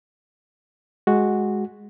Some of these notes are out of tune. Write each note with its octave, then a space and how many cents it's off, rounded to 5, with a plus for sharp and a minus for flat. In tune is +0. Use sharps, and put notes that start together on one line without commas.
G#3 +0 F#4 +0